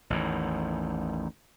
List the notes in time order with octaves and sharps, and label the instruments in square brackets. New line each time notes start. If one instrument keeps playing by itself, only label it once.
[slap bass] A1 E2 D#3